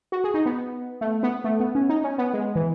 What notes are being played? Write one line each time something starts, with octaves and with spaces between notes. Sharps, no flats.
F#4
G#4
D#4
B3
A3
B3
A3
B3
C#4
D#4
C#4
B3
G#3
E3